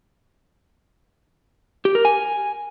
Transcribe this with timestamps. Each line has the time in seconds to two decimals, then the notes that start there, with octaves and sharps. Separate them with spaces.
1.85 G4
1.95 A#4
2.05 G#5